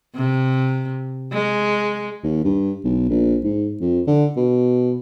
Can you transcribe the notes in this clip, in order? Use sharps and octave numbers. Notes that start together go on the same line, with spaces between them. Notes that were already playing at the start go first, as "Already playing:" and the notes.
C3
G#3
D#2
G2
B1
A#1
G#2
F2
D3
B2